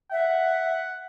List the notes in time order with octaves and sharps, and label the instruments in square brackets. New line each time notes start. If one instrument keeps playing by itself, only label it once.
[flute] E5 [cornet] F#5